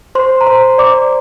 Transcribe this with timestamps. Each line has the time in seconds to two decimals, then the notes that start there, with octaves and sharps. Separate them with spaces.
0.15 C5 C6
0.41 A#5
0.47 C5 C6
0.78 D5 D6